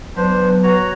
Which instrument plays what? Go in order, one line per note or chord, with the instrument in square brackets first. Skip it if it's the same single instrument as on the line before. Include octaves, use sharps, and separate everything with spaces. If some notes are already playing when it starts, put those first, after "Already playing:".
[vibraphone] F#3 B3 [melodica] D4 C5 [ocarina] B4
[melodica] F#4 C#5 A#5